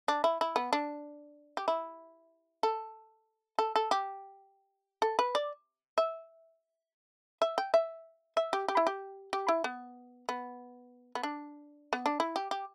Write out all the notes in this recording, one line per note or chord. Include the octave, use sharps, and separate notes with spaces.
D4
E4
E4
B3
D4
G4
E4
A4
A4
A4
G4
A4
B4
D5
E5
E5
G5
E5
E5
G4
G4
E4
G4
G4
E4
B3
B3
B3
D4
B3
D4
E4
G4
G4